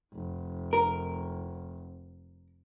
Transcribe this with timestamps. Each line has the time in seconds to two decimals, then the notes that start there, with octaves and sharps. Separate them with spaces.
0.14 F1
0.73 A#4